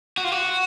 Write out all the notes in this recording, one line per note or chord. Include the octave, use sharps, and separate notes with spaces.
F#4
F4
F#4